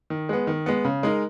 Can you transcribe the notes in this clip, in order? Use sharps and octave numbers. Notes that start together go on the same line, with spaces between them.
D#3
G#3 B3
D#3
G#3 B3
C#3
G#3 D#4 A#4